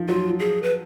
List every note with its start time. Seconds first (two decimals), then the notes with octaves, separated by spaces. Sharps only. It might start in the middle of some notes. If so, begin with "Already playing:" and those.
Already playing: D#3 F3
0.08 F#3 F4
0.40 G#4
0.63 B4